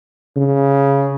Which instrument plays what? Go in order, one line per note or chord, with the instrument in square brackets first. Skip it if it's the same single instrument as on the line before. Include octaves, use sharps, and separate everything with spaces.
[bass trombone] C#3